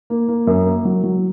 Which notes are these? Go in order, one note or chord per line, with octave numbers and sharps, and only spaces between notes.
A#3
A#3
F#2
A#3
F#3
F#3